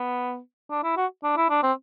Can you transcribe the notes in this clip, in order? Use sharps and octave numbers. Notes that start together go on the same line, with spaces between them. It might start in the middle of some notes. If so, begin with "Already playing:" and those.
Already playing: B3
D4
E4
F#4
D4
E4
D4
C4